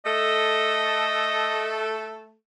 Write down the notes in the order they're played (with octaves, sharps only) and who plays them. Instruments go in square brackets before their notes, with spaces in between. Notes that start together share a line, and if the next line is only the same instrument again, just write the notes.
[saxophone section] A3 A4 [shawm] D#5